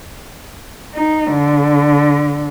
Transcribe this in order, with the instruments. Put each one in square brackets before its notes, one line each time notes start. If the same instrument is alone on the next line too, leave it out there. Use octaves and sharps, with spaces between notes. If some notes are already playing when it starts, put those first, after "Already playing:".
[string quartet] D#4
D3